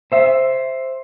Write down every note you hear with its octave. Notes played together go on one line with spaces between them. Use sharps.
C5 E5